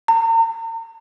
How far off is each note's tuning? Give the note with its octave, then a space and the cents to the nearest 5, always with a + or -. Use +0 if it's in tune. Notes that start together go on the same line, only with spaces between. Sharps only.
A#5 -40